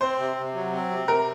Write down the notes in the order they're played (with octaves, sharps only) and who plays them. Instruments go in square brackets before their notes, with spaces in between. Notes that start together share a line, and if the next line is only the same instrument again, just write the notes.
[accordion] C4 [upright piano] C5
[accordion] C3
C3
F#3
C4
C3
[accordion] C3 [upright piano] A#4